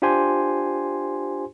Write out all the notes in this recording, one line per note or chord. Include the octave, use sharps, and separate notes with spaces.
D4 F4 G4 C5 G#5 C6